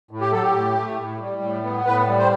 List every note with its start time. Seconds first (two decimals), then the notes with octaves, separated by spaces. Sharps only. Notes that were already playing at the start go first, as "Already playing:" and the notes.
0.11 A2
0.21 G4
0.32 F#3 A4
0.42 G4
0.54 A2
0.75 A3
0.98 A2
1.20 G3
1.42 A2
1.64 B3
1.85 A2 B4
2.08 G3
2.18 C5